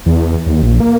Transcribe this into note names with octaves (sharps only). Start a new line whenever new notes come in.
E2
D#2
A#1
A#3